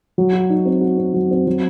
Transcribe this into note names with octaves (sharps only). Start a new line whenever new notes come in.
F#3
F#4
D#4
C4
F#4
C4
F#3
C4
F#3